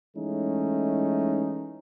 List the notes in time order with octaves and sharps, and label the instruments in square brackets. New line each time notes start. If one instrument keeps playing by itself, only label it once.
[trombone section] E3 G#3 A3 C#4 D#4